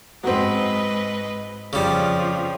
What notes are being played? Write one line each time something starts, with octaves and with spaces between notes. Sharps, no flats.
G#2 F#3 C4 B4 D#5
F2 C#3 F3 G3